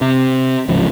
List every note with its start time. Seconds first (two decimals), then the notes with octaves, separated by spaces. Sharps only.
0.01 C3
0.68 D1 G#1 C#3 F3